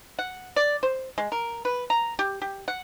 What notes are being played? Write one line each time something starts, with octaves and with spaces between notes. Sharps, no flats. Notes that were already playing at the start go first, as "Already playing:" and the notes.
F#5
D5
C5
G#3
A#4
B4
A#5
G4
G4
F#5